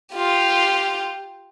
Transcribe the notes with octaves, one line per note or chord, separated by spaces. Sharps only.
F4 G4